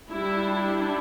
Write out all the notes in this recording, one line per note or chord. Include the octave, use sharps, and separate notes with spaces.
G3 D4 E4
E4